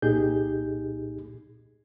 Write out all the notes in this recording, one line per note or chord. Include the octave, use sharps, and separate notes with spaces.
C2 A#2 D#4 G4 G#4 G6